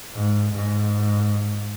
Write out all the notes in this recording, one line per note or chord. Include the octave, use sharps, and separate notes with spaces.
G#2
G#2